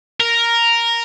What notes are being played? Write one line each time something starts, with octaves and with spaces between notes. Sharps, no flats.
A#4